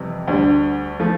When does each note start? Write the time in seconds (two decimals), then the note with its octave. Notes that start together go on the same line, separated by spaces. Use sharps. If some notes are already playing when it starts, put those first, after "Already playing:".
Already playing: F2 C3 E3 G3
0.28 D2 D3 G3
1.00 F3 A3